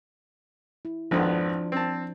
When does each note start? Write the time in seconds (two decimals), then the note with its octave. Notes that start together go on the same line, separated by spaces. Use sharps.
0.85 E4
1.11 G#1 F2 F3 B3 D4 C5
1.72 C4 A5